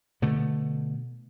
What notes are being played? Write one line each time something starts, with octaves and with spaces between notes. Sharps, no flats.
B2 D3 A3